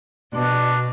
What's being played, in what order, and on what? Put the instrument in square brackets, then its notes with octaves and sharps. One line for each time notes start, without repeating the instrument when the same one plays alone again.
[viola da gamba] B2 [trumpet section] D4